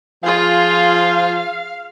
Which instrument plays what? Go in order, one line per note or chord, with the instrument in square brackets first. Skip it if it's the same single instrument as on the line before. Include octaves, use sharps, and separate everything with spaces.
[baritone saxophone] F3 [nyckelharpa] F4 G#4 [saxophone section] F5